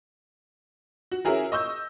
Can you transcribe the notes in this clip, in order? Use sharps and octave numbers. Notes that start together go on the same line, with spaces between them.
F#4
C#4 E4 F#4 G#4 A#4
D#5 C#6 E6 G6